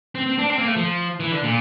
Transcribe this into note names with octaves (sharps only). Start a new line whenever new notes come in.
C4
C4
D4
C4
A#3
A3
F3
E3
D3
A#2